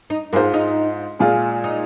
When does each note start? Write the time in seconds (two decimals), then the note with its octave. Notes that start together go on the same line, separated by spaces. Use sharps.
0.10 D#4
0.33 G#2 G#3 A#3 F4 C5
0.54 D#4
1.19 A#2 G#3 F4 G#4
1.64 D#4